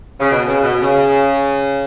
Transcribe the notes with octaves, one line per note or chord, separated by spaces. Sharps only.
C#3
B2
C#3
B2
C#3